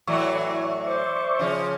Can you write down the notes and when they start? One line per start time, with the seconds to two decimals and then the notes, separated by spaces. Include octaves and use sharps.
0.07 A2 E3 F#3 D5 E5 C#6
0.84 C5 D6
1.39 C#3 F3 C#4